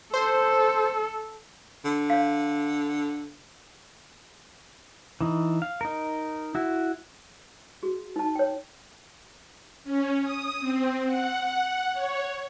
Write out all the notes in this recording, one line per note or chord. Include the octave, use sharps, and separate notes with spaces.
A4 C5
D3
C#5 F5
E3 D#4
F5
D#4 A#4
E4 F#4
F#4 G#4
D#4 A5
C#5 G5
C#4
D#6
C4
F#5
C#5